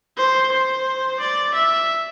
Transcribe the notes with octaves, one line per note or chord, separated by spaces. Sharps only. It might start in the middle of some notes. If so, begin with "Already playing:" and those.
C5
C5
D5
E5